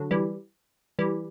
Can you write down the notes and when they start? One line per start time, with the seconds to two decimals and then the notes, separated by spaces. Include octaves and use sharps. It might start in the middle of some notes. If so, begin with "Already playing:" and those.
Already playing: D3 F#3
0.11 E3 G3
0.99 E3 G3